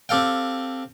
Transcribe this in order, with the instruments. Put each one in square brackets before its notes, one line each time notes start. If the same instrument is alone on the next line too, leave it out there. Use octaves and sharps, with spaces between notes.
[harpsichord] C4 G4 A4 F5 G5